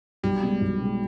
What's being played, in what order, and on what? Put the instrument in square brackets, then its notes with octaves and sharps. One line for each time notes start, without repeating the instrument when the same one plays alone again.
[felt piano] B1 [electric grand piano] G3
[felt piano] B2 G#3
B1
B2 G#3